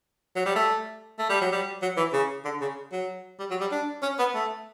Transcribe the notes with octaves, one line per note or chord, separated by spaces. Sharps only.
F#3
G3
A3
A3
G3
F#3
G3
F#3
E3
C#3
D3
C#3
F#3
G3
F#3
G3
D4
C#4
B3
A3